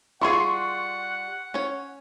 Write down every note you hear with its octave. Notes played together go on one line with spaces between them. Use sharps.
G3 F4 G#4 F#5 C6 C#6
C#4 C#5